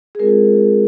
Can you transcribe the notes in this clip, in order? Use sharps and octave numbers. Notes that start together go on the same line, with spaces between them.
G#4
G#3 C4 F4 A#4